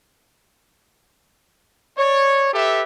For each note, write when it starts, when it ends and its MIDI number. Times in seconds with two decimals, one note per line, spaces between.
1.98 2.49 73
1.98 2.49 74
2.54 2.84 67
2.54 2.84 69
2.54 2.84 71
2.54 2.84 76